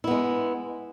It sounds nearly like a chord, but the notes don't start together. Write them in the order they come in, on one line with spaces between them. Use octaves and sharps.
E4 B3 G#3